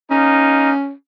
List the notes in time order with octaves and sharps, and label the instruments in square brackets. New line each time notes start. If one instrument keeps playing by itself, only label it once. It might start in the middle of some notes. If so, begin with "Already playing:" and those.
[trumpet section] A#3 D#4 [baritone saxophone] C#4